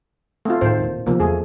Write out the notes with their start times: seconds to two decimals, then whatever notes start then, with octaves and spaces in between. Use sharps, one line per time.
0.45 A3 C4 F4
0.61 F#2 A2 D#3 C5
0.80 D#1 A2
1.06 C3 F3 A#3 B3
1.20 E2 A3 G#4